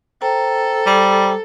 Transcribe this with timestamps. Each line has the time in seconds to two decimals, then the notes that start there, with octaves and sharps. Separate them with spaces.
0.22 A4 C5 G5 A#5
0.86 G3